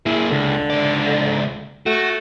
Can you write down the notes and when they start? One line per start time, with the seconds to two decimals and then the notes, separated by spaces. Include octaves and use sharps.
0.06 A#3 E4 G#4
0.31 C#2 D3
0.70 C#2 D5
1.86 A3 F#4